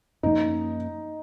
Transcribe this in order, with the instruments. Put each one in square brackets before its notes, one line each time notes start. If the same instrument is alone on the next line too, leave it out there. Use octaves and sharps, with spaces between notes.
[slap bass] F#2 F3 A#3 C#4 [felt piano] D#4